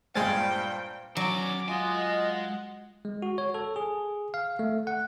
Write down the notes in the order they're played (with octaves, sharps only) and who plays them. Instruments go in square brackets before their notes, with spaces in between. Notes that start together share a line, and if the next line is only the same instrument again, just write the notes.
[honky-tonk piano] G2 A#2 [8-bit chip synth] G#3 G#5 A6 [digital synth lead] C5 [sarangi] G5
[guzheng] F#3 [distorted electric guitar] C#4 D5 [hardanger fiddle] D6
[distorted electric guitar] G#3 G#5 [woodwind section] F4 D#5 [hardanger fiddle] F#5
[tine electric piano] G#3
F#4
C#5
A4
G#4
F5
A3
F#5